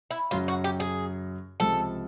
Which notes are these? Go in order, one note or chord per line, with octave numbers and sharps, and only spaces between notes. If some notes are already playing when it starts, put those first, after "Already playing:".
E4
F#2 C#3 F#3 F4
F#4
G4
G#4
C#2 C3 F3 A4